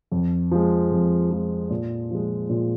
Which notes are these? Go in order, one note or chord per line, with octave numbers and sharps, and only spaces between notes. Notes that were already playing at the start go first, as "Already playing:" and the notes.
F2
F3 G#3
F2
F3 G#3
A#2
F3 G#3
A#2